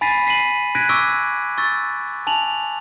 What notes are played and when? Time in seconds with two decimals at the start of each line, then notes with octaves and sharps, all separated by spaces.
0.01 G#5 B5 A6 B6 C7 D#7
0.27 B6 C7 D#7 F#7
0.75 F#6 G#6 A#6 B6 D7 D#7
0.89 C#6 D6 E6 A#6 D7
1.58 C#6 E6 A6
2.27 G#5 A5 F7 F#7